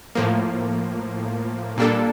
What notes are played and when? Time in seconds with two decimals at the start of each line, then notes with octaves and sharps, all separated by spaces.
0.15 A2 F3 A#3
1.78 A#2 G3 A#3 D4 A4